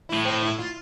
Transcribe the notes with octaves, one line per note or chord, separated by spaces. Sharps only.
A2 E4
C4
E4
F4